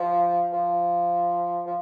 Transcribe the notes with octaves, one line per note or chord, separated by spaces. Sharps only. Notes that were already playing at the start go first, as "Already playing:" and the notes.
Already playing: F3
F3
F3